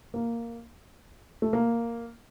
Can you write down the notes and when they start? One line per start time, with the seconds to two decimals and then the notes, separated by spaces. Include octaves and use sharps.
0.14 A#3
1.42 A3
1.53 A#3